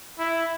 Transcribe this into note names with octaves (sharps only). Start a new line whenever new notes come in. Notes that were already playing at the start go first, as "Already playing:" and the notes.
E4